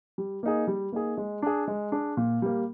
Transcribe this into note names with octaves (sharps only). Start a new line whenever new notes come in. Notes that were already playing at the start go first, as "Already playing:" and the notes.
G3
A#3 D#4 G#4
G3
A#3 D#4 G#4
G#3
D4 G#4
G#3
D4 G#4
A#2
G3 A#3